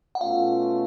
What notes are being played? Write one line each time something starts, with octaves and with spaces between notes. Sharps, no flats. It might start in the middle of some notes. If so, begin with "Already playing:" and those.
F#5
B2 A3 C#4 F4 F5